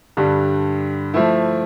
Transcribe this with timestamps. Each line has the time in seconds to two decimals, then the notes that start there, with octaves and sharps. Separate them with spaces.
0.17 G2 D3 G3
1.14 F3 A3 E4